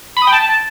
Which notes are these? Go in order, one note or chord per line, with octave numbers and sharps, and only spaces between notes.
B5
D#6
G5
A5